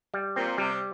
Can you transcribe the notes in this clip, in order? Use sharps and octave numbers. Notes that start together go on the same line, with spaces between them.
G3
A#2 C4
C3 G3